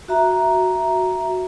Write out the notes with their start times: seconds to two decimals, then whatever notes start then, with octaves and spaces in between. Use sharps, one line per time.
0.08 F#4 E5 A#5